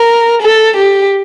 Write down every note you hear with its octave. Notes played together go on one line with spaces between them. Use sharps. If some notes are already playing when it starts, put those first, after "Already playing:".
Already playing: A#4
A4
G4